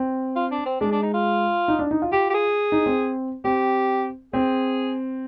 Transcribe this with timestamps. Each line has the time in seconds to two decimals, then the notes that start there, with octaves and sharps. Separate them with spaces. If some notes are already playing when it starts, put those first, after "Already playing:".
Already playing: C4
0.36 F4
0.51 D4
0.66 C4
0.81 G#3 D4
0.92 D4
1.03 D#4
1.14 F4
1.68 D#4
1.79 D4
1.91 D#4
2.02 F4
2.12 F4 G4
2.30 G4
2.34 G#4
2.72 D#4
2.86 C4
3.44 C4 G4
4.33 C4 G#4